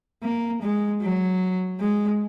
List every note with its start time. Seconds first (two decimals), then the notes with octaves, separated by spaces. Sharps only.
0.23 A#3
0.62 G#3
1.02 F#3
1.80 G#3